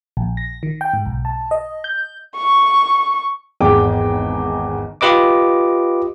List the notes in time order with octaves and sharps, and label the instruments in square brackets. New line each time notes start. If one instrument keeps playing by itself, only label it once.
[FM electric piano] A#1
A#6
D#3
G5
G#2
B1
A5
D#5
G6
[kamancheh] C#6
[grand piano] G#1 E2 G#4 G5 D6
[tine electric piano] F4 G4 B4 D#5 D6